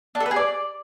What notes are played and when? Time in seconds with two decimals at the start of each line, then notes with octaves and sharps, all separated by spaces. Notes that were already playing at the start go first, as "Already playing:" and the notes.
0.15 D4
0.20 A4
0.26 B4
0.31 G#4
0.36 D5